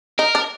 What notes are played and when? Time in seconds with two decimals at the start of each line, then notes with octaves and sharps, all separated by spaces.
0.18 D#4 A#4
0.35 D4